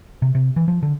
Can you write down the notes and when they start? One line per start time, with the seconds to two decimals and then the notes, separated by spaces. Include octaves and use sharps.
0.22 C3
0.35 C3
0.56 E3
0.68 F3
0.83 D3